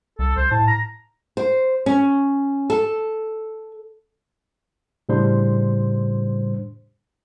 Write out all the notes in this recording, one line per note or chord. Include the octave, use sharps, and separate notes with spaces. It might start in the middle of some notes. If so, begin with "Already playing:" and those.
C2 A4
C2 C5
A2 A5
A#5
C5
C#4
A4
A2 C#3 G3 D4 C5 C6